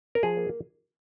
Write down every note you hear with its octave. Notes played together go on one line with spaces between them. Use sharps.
A#4
F3 G#4
A#3